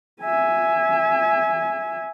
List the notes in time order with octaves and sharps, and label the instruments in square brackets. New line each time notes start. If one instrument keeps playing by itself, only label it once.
[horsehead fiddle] E5 G#5